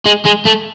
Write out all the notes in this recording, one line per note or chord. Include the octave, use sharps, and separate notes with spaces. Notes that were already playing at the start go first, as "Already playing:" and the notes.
G#3
G#3
A3